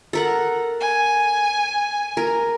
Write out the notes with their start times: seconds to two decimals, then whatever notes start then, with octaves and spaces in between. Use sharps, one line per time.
0.13 A4 A#4 F#5
0.81 G#5
2.17 A#4